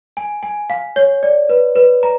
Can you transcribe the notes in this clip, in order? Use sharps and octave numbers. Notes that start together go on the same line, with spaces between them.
G#5
G#5
F5
C#5
D5
B4
B4
A#5